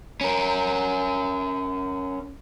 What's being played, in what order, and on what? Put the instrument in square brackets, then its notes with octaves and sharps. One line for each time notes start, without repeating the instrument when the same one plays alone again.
[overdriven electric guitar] C#4 A#4